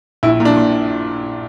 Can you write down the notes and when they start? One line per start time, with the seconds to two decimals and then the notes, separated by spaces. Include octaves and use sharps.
0.23 A#1 E4
0.40 A#2
0.45 D4
0.57 A#2